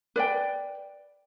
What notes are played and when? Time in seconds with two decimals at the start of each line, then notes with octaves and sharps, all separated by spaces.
0.16 B4 D5 G5